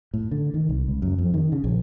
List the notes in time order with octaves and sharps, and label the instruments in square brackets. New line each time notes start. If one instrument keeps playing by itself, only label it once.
[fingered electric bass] A2
D3
D#3
C2
C#2
F#2
F2
D#3
C#3
A#1